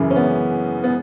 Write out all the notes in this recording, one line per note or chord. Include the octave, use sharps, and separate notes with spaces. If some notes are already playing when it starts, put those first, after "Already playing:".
Already playing: F#2 C#3 E3
C#4
B3
B3